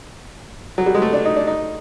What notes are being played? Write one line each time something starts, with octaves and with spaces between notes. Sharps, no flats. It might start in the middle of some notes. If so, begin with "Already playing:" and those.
F#3
G3
G#3
A3
D4
D#4
D4
D#4